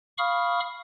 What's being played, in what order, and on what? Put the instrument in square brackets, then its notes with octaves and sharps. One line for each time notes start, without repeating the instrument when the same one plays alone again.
[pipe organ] F5 B5 C#6 D#6 F6